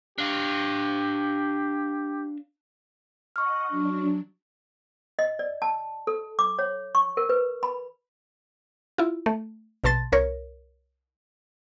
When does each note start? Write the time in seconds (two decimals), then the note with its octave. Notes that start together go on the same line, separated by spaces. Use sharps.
0.18 D4 G4 F5
3.36 D#5 F#5 C#6 F6
3.68 F#3 D4
5.19 D#5
5.39 D5
5.62 A5
6.07 A4
6.39 D6
6.59 C#5
6.95 C#6
7.17 A#4
7.29 B4
7.63 B5
8.98 E4 F4
9.26 A3
9.84 A#1 B2 A5 C6 A6
10.12 C2 A#4 C#5